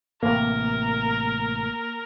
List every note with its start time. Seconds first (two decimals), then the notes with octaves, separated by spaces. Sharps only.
0.23 A1 A2 C3 A#3 A#4